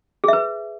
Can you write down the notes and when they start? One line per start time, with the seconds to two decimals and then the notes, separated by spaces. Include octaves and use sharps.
0.24 G#4
0.28 E5
0.33 B4